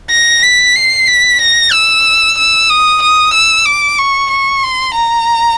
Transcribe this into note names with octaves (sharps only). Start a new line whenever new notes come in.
A#6
B6
C7
B6
A#6
E6
E6
D#6
D#6
E6
D6
C#6
C#6
C6
A#5